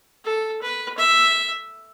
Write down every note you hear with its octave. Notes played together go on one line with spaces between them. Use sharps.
A4
B4
E5